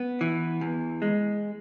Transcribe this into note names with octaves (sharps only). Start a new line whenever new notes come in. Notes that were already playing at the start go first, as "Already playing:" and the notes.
Already playing: B3
E3
E2
G#3